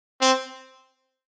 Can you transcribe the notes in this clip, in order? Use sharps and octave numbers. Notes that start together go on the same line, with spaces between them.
C4